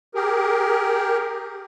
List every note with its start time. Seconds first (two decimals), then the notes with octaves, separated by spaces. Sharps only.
0.15 G4 G#4 A#4